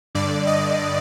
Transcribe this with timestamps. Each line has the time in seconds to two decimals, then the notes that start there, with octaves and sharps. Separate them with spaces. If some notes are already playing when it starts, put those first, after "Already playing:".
0.15 G2 D3 D5
0.47 D#5